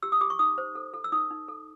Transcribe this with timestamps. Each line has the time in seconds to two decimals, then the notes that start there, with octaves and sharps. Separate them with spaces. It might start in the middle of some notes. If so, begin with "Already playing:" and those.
0.03 G4 E6
0.12 D#6
0.21 G4 D6
0.30 C#6
0.39 D#4 D#6
0.58 C5
0.75 A4
0.94 A4
1.04 E6
1.12 D#4 D#6
1.30 D#4
1.48 A4